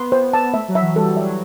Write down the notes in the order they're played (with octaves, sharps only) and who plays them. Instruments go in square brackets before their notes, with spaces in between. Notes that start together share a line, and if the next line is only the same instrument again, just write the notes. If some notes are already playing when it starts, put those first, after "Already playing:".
Already playing: [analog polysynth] B3 [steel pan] C6
[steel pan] C5
A5
[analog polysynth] A3 [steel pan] E5
[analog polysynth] F#3
[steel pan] E5
[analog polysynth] E3
[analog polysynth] G3 [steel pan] A4
[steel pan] E5
[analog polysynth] F#3